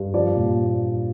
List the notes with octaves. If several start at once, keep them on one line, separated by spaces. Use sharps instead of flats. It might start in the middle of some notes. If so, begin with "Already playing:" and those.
Already playing: G2
F3 D5
A#2